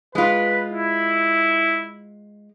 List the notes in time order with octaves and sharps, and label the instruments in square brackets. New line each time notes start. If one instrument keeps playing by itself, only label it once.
[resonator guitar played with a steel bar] G#3 F4 [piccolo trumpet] B4
[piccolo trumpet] E4